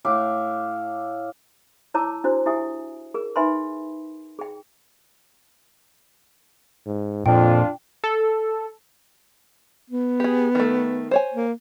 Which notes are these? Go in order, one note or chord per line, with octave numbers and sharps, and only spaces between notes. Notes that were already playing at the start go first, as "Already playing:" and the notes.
A2 E5 F5 D6
E4 C#5 A5 A#5 D6 E6
D4 E4 F#4 C5
E4 G4 E5 G#5 D#6
G#4 A#4
D#4 B4 E5 G#5 B5 C6
G#4 G5
G#2
F2 A#2 D4 F4 G5
A4
B3
G4 G#4
D#3 A3
C5 C#5 G#5
A#3